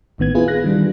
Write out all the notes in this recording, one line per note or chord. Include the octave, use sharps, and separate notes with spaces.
A1 A2 D#3 B3 G#6
B3 E4 F4 G#4 B4
F#6 A#6
D#3 G3 D4